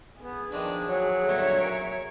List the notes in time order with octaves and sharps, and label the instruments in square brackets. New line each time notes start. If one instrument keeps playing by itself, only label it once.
[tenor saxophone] B3 [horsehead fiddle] G#4
[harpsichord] D#3 F3 B4 [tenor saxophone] D4
[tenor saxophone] F#3
[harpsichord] G2 A#2 D3 [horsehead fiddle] C#5 E5
[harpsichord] G#4 A#4